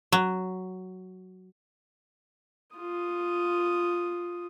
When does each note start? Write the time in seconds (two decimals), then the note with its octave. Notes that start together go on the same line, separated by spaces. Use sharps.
0.12 F#3
2.76 F4 D#6